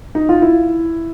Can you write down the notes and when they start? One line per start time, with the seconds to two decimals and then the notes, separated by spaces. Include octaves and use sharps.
0.15 D#4
0.29 F4
0.42 E4